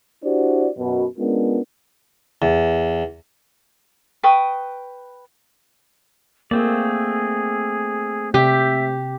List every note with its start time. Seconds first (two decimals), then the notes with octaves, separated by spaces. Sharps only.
0.24 D4 E4 F#4 G4 C5 D5
0.78 F#2 B2
1.18 G#3 B3 C#4 D4 F4 A#4
2.42 E2
4.24 B4 G5 C#6 D#6
6.51 A3 A#3 C4 G#4 D5
8.34 C3 G4 E5